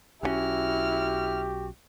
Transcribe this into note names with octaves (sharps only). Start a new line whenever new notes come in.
B1 F3 C#4 E4 F#4 G4 F6